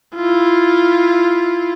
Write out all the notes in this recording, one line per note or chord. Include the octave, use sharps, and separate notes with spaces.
E4 F4